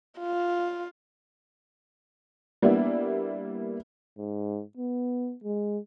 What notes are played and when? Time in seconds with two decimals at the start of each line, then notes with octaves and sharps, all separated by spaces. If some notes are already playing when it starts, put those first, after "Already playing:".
0.20 F4
2.62 G3 A#3 B3 D4 E4
4.18 G#2
4.78 B3
5.44 G#3